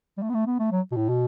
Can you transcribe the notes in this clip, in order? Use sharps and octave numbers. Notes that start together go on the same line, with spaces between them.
G3
A3
B3
A3
B3
A3
F#3
B2
A2
B2